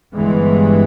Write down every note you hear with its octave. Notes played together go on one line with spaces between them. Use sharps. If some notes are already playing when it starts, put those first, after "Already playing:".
G1 G2 E3 G#3 B3